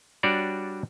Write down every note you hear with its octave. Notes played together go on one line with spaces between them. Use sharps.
G3 D4 F#4 C#5 D5